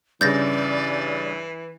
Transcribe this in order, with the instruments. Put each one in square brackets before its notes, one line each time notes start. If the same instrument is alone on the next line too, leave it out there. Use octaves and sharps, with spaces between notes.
[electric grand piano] G2 C#3 [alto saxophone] E3 [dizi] D5 [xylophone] G6 A6 A#6